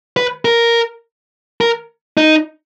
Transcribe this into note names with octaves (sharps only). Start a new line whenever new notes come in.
B4
A#4
A#4
D#4